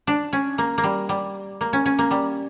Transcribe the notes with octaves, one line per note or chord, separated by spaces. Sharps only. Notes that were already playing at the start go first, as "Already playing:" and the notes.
D4
C#4
A#3
A#3
G3
G3
A#3
C#4
C#4
A#3
G3